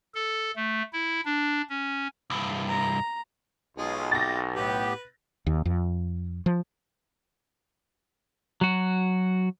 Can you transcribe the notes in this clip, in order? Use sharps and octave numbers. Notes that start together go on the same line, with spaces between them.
A4
A3
E4
D4
C#4
C2 G2
A#5
B1 G#3 F4
G4 A6 A#6
A2 B3 G4 B4
D#2
F2
F3
F#3 F#4